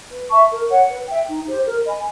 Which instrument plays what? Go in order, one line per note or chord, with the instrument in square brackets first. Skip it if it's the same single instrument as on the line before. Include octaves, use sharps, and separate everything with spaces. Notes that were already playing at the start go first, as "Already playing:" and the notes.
[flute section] B4
E5 A5 C#6
A#4
C#5 F#5
B4
E5 G5
D#4
G4 C5
A#4
D#5 G#5 B5